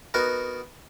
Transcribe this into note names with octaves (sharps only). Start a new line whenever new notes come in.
B3 D#4 F#4 A#4